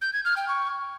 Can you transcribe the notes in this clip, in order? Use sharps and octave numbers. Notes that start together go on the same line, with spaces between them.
G6
G#6
F6
G5
C#6